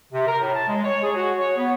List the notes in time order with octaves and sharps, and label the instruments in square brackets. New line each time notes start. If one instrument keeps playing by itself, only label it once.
[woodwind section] C3
A#4
A2
A5
G#3
C#5
G#4
F#4
C#5
B3